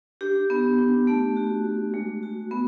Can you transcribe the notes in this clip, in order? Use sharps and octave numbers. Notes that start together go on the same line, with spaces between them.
D4 G4
B3
D4
A3
F#4
A3
G#3
F#4
B3